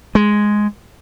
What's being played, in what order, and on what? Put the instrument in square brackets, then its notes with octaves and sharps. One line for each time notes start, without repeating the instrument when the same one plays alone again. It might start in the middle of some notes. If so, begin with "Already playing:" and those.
[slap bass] G#3